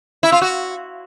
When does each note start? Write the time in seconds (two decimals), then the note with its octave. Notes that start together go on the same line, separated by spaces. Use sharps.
0.23 E4
0.32 F4
0.41 F#4